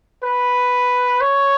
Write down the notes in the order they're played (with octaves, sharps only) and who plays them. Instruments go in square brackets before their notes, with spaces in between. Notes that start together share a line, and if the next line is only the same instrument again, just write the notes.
[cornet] B4
C#5